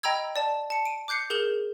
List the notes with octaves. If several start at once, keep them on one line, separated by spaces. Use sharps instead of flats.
D#5 G5 A#5 B5 E6 G#6
D5 A5 E7
A5 C#7
D7 D#7
D6 F#6 G6 C7 C#7
G#4 A#4 G6 E7 F#7